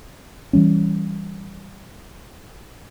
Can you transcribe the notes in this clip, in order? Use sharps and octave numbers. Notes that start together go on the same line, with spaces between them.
E3 G3 C#4